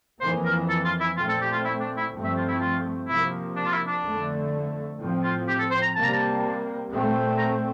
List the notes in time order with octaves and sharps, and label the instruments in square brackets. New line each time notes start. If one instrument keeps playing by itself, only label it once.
[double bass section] F2 E3 A#3 [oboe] C5
[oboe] A#4
A4
F4
E4
[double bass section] A#2 A3 C4 [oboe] F4
[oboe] A4
G4
F4
E4
D4
E4
[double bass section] G2 F3 A3 C4
[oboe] E5
F4
E4
F4
[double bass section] C3 F3 A#3 [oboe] E4
[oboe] D4
F4
E4
D4
[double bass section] F2 D3 A3
A2 F3 C4
[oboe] F4
G4
A4
C5
A#5
[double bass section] C3 G3 A#3 [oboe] A5
[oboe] A#5
A5
[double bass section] A#2 A3 C4
[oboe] A#5